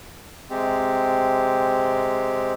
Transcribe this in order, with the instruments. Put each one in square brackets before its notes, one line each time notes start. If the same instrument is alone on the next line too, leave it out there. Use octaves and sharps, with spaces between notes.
[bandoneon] C3 G#3 C4 G4